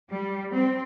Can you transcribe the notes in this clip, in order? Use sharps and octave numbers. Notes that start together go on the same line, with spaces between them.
G3
C4